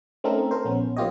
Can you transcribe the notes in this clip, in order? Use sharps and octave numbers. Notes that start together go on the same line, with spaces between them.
A3 C4 C#4 D#4 A4 A#4
A4 A#4 C5
A#1 B3 C#4
F3 A#3 F4 G4 C#5 D#5